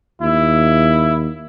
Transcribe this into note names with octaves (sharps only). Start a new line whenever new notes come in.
D#2 E4